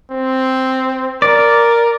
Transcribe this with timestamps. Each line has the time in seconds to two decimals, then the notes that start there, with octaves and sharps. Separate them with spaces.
0.11 C4
1.22 A#4 D5